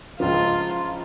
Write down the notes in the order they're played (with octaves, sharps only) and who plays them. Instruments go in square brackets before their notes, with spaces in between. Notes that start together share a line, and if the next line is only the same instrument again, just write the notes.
[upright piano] C#2 C#3 F3 [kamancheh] F4